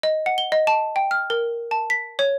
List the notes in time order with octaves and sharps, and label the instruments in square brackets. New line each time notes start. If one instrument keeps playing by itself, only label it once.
[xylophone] D#5
F#5
G7
D#5
A5
G5
F6
A#4
A5
B6
C#5